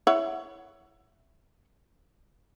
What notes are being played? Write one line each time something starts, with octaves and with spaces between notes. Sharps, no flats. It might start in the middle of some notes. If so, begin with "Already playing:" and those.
E4 C#5 F#5